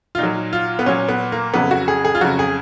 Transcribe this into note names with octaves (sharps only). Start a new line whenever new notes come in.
F4
A#2 F#3 D#4
F4
B3
A#2 F#3 C#4
B3
A#3
F2 C#3 F#3 B3
F#4
G#4
G#4
F4
F2 C#3 F#3 F#4
G#4